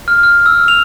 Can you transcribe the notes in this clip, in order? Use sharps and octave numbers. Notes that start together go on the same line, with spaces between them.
F6
F6
E6
F7